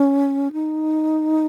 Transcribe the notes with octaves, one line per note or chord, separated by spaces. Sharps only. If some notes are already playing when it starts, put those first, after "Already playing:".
Already playing: C#4
D#4